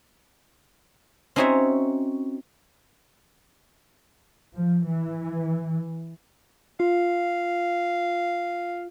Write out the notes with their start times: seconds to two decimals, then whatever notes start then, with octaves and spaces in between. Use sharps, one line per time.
1.36 C4 C#4 D#4 F#4 C#5 E5
4.56 F3
4.88 E3
6.80 F4 F5